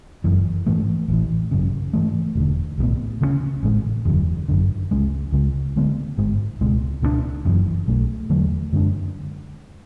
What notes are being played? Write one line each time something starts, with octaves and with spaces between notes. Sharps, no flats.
F#1 F#2 E3
G#2 E3 A3
A1 A2 E3
G#1 F#2 C#3
G#2 E3 A3
E1 D2 D3
B1 A2 F#3 B3
D2 C#3 G#3 C#4
A1 A2 G#3
F#1 E2 D3 F#3
G#1 F#2 D3
C#2 C#3 G#3
C#2 C#3 G#3
D2 D3 G#3 B3
G#1 G#2 G#3
C#2 B2 G#3
C#2 B2 G#3 D4
F#1 F#2 C#3 E3
B1 B2 A3
E2 D3 F#3 A3
F#2 D3 G#3 D4